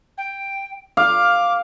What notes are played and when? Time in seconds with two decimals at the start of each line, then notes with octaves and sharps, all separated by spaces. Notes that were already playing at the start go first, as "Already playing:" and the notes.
0.17 G5
0.97 F5 D6